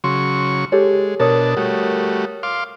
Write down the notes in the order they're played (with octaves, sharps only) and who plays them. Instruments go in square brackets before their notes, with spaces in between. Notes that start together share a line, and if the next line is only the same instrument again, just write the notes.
[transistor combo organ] C#3 F#3 C#6 [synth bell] C6
[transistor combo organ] G#3 [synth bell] G4 A4 C#5
[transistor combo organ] B2 D4 A5 [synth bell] A#4 C#5 D#6
[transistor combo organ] G3 A3 F#4
F5 C6 D6